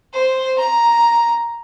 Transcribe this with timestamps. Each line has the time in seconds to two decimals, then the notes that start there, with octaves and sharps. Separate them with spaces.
0.13 C5
0.58 A#5